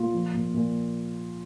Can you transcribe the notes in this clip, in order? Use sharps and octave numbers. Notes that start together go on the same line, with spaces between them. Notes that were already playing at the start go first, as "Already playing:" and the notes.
Already playing: A#2 F4
F3
A#2
A#2